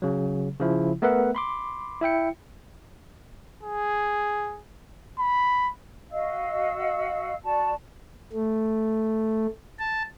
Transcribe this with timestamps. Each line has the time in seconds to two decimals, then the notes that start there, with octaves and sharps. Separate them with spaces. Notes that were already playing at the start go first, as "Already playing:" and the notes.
0.02 C#3 F#3
0.60 C#3 F3 E4
1.02 A3 B3 A#4 B4 E5 F#5
1.35 B5 C6 D6
2.01 E4 E5 G5 C#7
3.63 G#4
5.19 B5
6.11 F#4 D#5 F5 E6
7.44 F#4 D5 A5
8.32 A3
9.79 A5